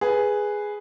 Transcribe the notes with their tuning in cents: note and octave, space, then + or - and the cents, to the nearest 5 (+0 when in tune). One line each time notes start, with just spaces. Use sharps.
G#4 +0 B4 +0